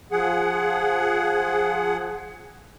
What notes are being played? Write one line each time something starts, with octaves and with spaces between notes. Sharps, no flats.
F3 G#4 F#5